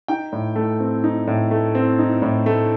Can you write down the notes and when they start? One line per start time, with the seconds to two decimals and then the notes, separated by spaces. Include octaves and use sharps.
0.08 D#4 G5
0.32 A2
0.56 A3
0.80 C4
1.04 D#4
1.27 A2
1.51 A3
1.75 C4
1.99 D#4
2.22 A2
2.46 A3